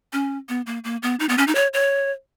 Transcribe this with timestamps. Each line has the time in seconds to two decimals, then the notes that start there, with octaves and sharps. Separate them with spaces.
0.13 C#4
0.49 B3
0.66 A#3
0.84 A#3
1.03 B3
1.20 D#4
1.29 B3
1.38 C#4
1.47 D#4
1.55 C#5
1.73 C#5